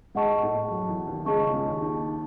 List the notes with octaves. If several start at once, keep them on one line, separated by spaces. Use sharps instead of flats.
G#2 G#3 G#4 D#5 F#5 A5 C#6
A2 A3
F#2 F#3
E2 E3
D#2 D#3
C#2 C#3 G#4 D#5 A5 C#6
C#2 C#3
C#2 C#3
D#2 D#3
D#2 D#3